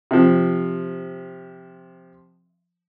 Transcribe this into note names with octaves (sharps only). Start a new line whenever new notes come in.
C3 F3